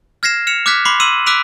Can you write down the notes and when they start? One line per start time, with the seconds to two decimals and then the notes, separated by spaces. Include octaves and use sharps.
0.23 F6 G#6 A#6 C7 E7
0.47 F6 C#7 E7 F7
0.66 D6 F6 F#6 G#6 B6
0.85 B5 C6 D6 C7
1.00 C6 E6 D#7 E7 F#7
1.26 D6 E6 F#6 B6 D7 F7